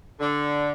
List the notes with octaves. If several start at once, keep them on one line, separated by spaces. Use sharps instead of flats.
D3